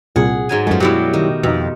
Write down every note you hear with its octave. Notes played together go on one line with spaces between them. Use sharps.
C2 A#2 G#4 F#5
G#2 F#3 G#5
F#2 F3 G#3 A3
B2 F#3 G3 E4 G4
D#3
F2 B2 D#4